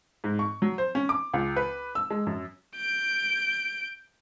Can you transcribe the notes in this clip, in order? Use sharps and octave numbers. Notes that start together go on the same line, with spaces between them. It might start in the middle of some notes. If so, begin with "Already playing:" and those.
G#2
C#6
F#3
C5
C#4
D6
C#2
B4
E6
G#3
F#2
G6 D7